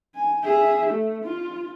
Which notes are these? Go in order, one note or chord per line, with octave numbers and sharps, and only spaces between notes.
G#5
G#4 E5
A3
F4